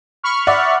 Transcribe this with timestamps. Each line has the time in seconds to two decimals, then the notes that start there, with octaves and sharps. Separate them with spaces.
0.23 B5 C#6 F6
0.47 D5 E5 F#5